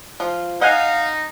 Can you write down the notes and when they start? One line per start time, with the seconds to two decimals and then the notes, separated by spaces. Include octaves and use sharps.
0.20 F3 F4
0.61 D#4 D#5 F5 F#5 G#5